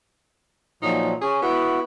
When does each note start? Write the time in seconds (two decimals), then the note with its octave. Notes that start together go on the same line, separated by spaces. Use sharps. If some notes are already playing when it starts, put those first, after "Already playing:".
0.82 A#2 F3 F#3 D#4
1.22 C#4 G#4
1.42 B3 E4 F#4